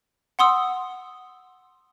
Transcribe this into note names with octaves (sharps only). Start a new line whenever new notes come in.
F#5 C6 D#6 E6